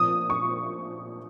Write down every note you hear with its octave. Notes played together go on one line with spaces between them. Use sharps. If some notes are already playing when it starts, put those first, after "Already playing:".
Already playing: A#2 F3 D#6
C#6